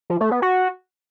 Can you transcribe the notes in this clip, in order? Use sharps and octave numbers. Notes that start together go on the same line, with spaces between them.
F3
A3
B3
F#4